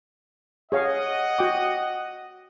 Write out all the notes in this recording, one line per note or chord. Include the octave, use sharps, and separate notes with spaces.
G#4 C#5 D#5 F5 F#5
F#4 G5 D6